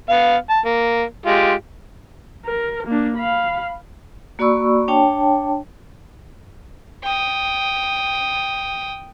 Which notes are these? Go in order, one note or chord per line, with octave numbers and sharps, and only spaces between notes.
B3 F5
A5
A#3
G#3 F4 G4
A#4
A#3 D4
F5 B5
A#3 F#4 D5 B5 C#6 E6
D4 C#5 G5 A5
G5 D#6